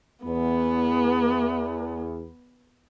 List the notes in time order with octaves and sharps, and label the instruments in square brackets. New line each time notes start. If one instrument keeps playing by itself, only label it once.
[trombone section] E2 [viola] B3